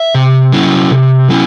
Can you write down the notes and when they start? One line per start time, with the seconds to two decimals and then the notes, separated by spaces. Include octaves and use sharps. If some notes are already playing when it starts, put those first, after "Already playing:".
Already playing: E5
0.15 C3
0.52 F#3 C#4 E4
0.91 C3
1.28 F#3 C#4 E4